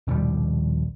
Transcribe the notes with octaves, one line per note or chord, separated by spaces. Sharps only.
A#1 D#2 B2 G3